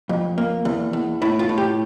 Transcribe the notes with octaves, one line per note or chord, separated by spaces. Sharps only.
F2
A#3
E2
E2
A2 E4
F4
A2
G4